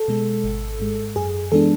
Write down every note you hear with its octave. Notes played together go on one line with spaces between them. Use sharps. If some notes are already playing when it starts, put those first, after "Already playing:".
Already playing: A4
B2 G#3
G#1
G#2 G#3
F#2 G#4
E3 G#3 B3 D4 A4